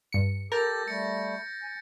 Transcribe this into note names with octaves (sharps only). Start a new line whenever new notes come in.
G2 C#7
G4 A4 A#4 G6 A6 A#6
G3 A3 C#7
G#5